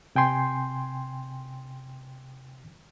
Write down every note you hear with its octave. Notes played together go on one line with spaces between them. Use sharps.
C3 G5 G#5 C6